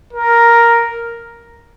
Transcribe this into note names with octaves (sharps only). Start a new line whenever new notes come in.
A#4